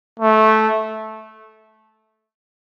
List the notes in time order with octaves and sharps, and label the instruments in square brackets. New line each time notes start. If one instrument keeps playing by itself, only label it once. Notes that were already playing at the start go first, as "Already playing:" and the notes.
[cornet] A3